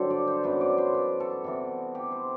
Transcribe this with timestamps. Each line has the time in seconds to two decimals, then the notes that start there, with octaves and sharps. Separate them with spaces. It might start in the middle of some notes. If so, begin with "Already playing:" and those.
Already playing: G2 D3 F#3 G4 A4 C5
0.10 D5
0.27 C5
0.43 F#2 E3 B3 B4
0.61 D5
0.78 C5
0.94 B4
1.20 A4
1.44 C3 E3 B3
1.95 G4
2.12 C5